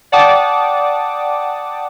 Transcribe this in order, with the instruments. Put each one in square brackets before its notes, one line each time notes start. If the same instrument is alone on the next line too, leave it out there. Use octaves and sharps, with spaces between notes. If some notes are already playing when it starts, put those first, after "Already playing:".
[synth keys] D5 F#5 G5 A5 D6 D#6